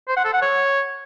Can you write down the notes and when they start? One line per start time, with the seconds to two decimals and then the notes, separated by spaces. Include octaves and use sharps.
0.08 C5
0.16 F#5
0.25 A4
0.33 F#5
0.42 C#5